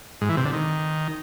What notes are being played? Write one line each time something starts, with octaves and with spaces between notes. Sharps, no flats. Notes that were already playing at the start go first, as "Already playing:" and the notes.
G#2
E3
C3
D3
D#3